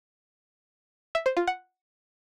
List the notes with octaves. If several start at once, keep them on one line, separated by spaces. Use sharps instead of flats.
E5
C5
F4
F#5